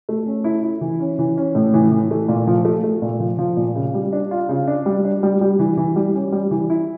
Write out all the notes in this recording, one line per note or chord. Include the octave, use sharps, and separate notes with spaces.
A3
C#4
E4
E4
E3
C#4
E3
C#4
A2
E3
E3
A3
A#2
F3
A3
A3
A#2
F3
F3
A#2
C#3
G3
D4
F4
C#3
D4
G3
D4
G3
G3
E3
E3
G3
C#4
G3
E3
E4